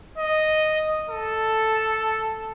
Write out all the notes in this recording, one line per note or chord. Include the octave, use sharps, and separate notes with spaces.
D#5
A4